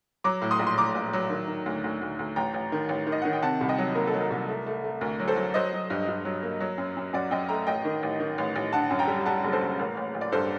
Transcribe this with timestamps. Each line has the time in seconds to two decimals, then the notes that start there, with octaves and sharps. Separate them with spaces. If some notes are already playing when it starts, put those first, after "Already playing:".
0.24 F#3 A#5 D6
0.42 A2
0.51 C6 D#6
0.59 A#1
0.67 C6
0.77 A2 A#5 D6
0.95 A#1
1.13 F#3
1.30 D#3
1.47 D#3
1.66 D2
1.84 D2
2.01 D2
2.19 D2
2.36 A1 G5 A#5
2.54 A1
2.72 D#3
2.89 A1
3.07 D#3
3.12 D#5
3.22 D#3 F#5
3.33 G5
3.42 C3 F#5 A5
3.61 C2
3.68 D#5 G5
3.78 F#3
3.95 A#3 A#4
4.07 A4
4.14 F#3
4.20 A#4
4.30 C2
4.49 A3
4.67 A3
4.84 A3
5.01 D2 A#4
5.20 F#3
5.28 A4 C5
5.36 F#3
5.54 F#3 C5 D#5
5.73 F#3
5.90 G2
6.08 G2
6.25 F#3
6.43 A#3
6.60 F#3
6.78 F#2
6.97 F#2
7.13 F#2 D5 F#5
7.31 F#2 D#5 G5
7.49 A3 G5 A#5
7.67 A1 D#5 G5
7.85 D#3
8.03 A1
8.20 D#3
8.38 A1
8.56 A1
8.73 D3 F#5 A5
8.90 F#2
8.99 G5 A#5
9.08 G3
9.26 G3 F#5 A5
9.44 F#1
9.52 A4 C5
9.61 F#1
9.79 A1 A#4
9.97 A1
10.14 A1
10.21 D5
10.32 G2 A4 C5